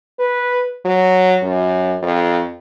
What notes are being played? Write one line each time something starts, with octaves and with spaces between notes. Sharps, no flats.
B4
F#3
F#2
F2